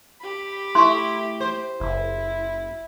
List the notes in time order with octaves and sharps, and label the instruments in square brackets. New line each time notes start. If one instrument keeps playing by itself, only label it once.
[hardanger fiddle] G4 B5
[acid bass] A3 [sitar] E4 [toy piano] C6 C#6
[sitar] C5
[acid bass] F#1 [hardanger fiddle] E4